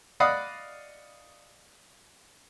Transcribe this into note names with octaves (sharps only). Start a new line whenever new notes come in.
D5 D#5 F5 F#5 B5 D#6